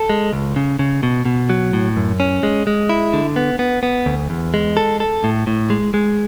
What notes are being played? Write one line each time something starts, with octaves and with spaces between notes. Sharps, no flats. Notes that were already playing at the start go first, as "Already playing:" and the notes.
Already playing: A4
G#3
C#2
C#3
C#3
B2
B2
F#3
A2
F#2
C#4
G#3
G#3
E4
D3
B3
B3
B3
D2
E2
G#3
A4
A4
A2
A2
G#3
G#3